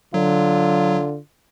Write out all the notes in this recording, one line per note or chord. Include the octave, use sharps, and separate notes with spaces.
D3 F#3 F4